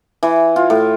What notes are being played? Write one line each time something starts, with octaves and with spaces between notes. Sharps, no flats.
E3
F4
A2